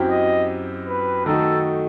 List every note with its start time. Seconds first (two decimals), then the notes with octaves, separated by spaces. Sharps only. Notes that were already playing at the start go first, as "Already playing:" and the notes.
Already playing: F#2 F#3 C4 E4 G4
0.11 D#5
0.88 B4
1.26 D#3 F#3 A3 D#4 F#4 A4